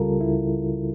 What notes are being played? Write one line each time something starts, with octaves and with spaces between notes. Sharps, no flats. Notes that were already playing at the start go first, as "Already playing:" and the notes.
Already playing: C#2 C#3 G3 F4 A4 A#4
C#2 E4